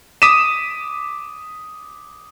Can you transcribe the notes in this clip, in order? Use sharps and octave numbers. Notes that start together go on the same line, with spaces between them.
D6 D#6 B6 D#7 E7